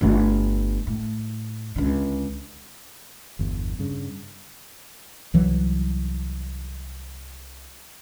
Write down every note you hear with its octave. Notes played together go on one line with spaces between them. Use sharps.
G1 A3
A2
C#2 D3
G1 E2
G2 C#3
C2 E3 F#3